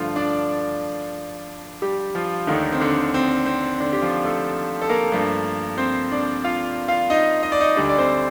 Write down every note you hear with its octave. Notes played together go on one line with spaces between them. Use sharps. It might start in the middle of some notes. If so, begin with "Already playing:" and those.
Already playing: G2 D3 F3 A3 F4
D4 D5
G3 G4
F3 F4
D#2 D3 D#3 A3 D#4
C4
D3 D4
C4
C4
D3 D4
G4
F3 F4
A3 A4
A4
A#3 A#4
G2 F3 A3
C4 C5
D4 D5
F4 F5
F4 F5
D#4 D#5
D#5
D5
D#4 D#5
D2 D3 G3 D4 D5
D5
C4 C5